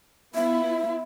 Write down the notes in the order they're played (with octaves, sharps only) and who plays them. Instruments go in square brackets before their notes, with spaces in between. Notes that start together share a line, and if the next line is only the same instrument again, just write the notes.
[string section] B3 E4 F4 [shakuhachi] E5